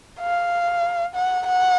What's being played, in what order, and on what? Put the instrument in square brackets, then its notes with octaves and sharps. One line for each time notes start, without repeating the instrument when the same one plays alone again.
[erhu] F5
F#5
F#5